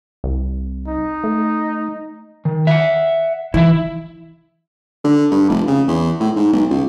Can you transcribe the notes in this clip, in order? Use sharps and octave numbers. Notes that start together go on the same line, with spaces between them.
C2
D#4
A3
D#3
E5 F#5
E3 E4 E5
D3
G2
F1
C#3
E2
A2
G#2
B1
C#2